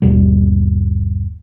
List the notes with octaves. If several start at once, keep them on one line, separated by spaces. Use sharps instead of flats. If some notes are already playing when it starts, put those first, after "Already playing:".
G1 D#2 B2 G3